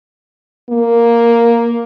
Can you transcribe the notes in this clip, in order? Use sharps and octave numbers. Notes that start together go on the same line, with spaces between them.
A#3